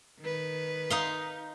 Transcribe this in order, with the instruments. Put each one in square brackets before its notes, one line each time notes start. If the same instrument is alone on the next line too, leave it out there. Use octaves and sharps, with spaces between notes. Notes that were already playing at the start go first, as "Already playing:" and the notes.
[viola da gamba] D#3 B4
[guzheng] D#4 F5 C6